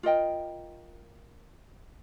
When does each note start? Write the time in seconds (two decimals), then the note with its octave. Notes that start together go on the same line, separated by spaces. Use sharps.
0.03 F4 A#4 D#5 G5